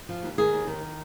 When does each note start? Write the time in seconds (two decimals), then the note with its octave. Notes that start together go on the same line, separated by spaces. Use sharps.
0.09 F3
0.23 D#2
0.38 D#3 G#4
0.53 D#2
0.67 D#3